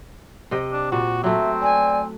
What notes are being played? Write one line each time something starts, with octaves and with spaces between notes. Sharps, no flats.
C3 D#5 G5
D4
A#2 F#4
F#3 A3 C4 E5
D5 G#5